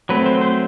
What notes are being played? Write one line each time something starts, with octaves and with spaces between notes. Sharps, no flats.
F#3 A3 C4 B4
C5
C5